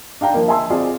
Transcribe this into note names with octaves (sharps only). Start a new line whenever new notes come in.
D4 F5 G5 A#5
F3 A#3
E5 G#5 A5 C6 E6
C4 F4 G#4 D5